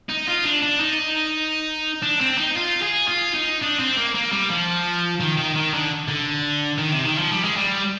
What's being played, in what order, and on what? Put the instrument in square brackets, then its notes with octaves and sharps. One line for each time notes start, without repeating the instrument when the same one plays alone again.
[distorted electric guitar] D#4
F4
D4
D4
D#4
D4
C4
D#4
F4
G#4
F4
D#4
D4
C4
A#3
A#3
G3
F3
D#3
D#3
D#3
D3
D3
D#3
C3
D#3
F3
G3
G#3
G3